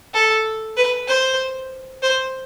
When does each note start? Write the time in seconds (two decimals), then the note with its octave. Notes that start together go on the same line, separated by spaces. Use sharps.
0.14 A4
0.77 B4
1.08 C5
2.02 C5